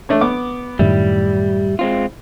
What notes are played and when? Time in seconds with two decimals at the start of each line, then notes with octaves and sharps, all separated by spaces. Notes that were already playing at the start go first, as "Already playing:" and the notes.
0.09 A3 D4 C#5
0.21 B3 D6
0.79 F#2 A2 D#3 G3 E4
1.79 G#3 C4 F4